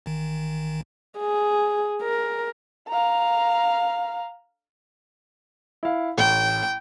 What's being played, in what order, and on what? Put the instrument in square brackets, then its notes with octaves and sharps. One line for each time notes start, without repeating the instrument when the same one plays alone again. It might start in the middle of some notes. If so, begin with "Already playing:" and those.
[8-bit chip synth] A1 D#3
[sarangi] G#4
A#4
[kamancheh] F5 A#5
[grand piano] E4 F5
[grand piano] A1 [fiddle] G5